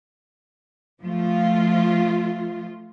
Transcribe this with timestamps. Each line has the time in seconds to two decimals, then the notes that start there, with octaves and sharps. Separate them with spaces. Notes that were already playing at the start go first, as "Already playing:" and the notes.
1.02 F3 A3 F4